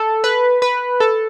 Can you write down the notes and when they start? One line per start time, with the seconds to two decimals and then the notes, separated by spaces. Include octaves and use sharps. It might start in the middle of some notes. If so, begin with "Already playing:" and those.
Already playing: A4
0.24 B4
0.62 B4
1.00 A4